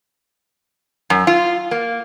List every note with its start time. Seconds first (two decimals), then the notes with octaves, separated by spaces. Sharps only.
1.10 F#2
1.27 F4
1.71 A#3